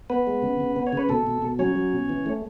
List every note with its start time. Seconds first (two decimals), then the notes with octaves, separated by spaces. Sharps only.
0.10 B3 B4
0.27 G#3
0.42 C#3
0.60 C#3
0.76 B3
0.87 C#5
0.93 C#3 B4
1.09 B2 A4
1.27 B2
1.42 B2
1.59 F#3 C#4 C#5
1.76 F#3
1.93 B2
2.09 E3
2.26 A3